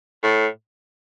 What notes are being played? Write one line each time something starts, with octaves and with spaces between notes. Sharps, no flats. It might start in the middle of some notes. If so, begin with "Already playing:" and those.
A2